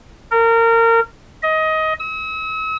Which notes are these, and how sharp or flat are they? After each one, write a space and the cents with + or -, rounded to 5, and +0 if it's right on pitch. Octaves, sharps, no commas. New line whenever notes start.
A#4 -25
D#5 +20
E6 -45